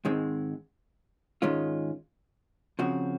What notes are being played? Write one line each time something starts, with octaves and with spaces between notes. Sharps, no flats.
G#2 D#3 G#3 C4
G#2 D#3 G#3 C#4 F4
C#3 F3 C4 F#4